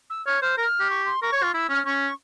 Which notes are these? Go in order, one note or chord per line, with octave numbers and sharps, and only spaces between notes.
E6
C#5 F6
C5 F6
A#4 F6
G4
C#6
C6
A#4 C#6
C#5
F4
E4 E6
C#4 F6
C#4 C#6